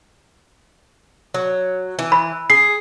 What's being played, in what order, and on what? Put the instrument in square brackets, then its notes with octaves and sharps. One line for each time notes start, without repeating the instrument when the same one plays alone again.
[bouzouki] F#3
E3
[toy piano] B5
[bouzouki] G#4 [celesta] C7